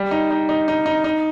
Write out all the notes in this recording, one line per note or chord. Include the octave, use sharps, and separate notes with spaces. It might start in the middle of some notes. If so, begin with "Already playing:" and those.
Already playing: G3
D#4
D#4
D#4
D#4
D#4
D#4